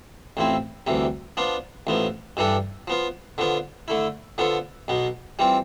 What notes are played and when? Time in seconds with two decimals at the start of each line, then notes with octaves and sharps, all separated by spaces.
0.37 A1 A2 F3 C4 E4
0.87 D2 C3 E3 G3
1.37 F3 B3 D4 F4
1.87 A1 A2 F3 B3
2.37 G2 E3 G3 D4 A4
2.88 F3 B3 F4
3.38 D3 F3 B3 F4
3.88 D3 A3 E4
4.38 D3 F3 B3 F4 A4
4.88 B1 B2 B3
5.39 E3 G3 C4 F4